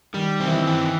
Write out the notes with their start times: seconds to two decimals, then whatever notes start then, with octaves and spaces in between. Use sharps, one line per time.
0.14 D#3 G3
0.40 D#3 C4
0.47 E3
0.56 D#3
0.66 D#3 E3